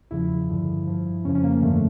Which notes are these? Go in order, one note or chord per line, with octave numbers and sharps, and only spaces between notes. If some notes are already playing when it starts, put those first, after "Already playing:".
E2 C#3 F3 E4
G2 D3 F3
G2 F3
F2 C#3 F3 C#4
C#4
A#3
G2 D3 F3 A3